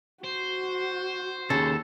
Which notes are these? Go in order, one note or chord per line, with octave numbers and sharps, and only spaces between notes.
F#4 C5
D#2 C#3 A4